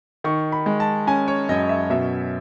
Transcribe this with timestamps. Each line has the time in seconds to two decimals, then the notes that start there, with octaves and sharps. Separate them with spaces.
0.24 D#3 C#6
0.52 B5
0.66 G#3
0.80 A5
1.07 C#4 G#5
1.28 C#5
1.49 F#2 D#5
1.69 E5
1.90 B2 E5